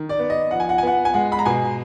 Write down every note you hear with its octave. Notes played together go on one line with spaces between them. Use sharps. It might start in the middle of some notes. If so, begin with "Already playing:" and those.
Already playing: D#3
D5
B3
D#5
F3 F#5
G#5
F#5
G#5
B3 F#5
G#5
G#3 F#5
B5
A#5
B2 G#5